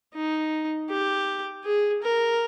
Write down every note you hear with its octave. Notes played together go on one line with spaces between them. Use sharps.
D#4
G4
G#4
A#4